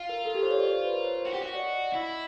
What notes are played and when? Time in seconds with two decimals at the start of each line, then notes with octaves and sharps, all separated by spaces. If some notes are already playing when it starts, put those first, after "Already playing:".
Already playing: F4
0.09 A#4
0.25 A4
0.35 G4
0.43 C5
0.51 C#5
0.59 D5
0.67 C#5
0.76 C5
0.84 B4
0.93 A#4
1.04 C5
1.15 C#5
1.26 F#4
1.33 G4
1.42 F#4
1.54 D5
1.59 D#5
1.93 E4